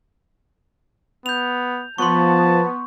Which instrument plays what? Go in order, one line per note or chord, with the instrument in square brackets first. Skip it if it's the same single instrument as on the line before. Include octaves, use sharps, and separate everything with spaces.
[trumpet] B3 [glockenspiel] G6 F7
[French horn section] F3 [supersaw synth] B3 [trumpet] A5 [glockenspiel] C6 C#6